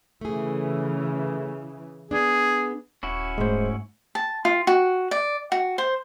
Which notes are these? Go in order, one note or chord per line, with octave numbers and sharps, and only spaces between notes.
C#3 E3 A3 G#4
B3 D4 G#4
D#1 C#4 E4 F#4
G#2 G#3 A3 C5
A5
F4
F#4
D5
F#4
C5